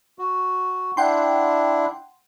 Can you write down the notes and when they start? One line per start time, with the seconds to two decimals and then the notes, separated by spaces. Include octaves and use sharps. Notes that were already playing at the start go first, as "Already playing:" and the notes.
0.19 F#4
0.97 D4 E4 F#5 G5 C6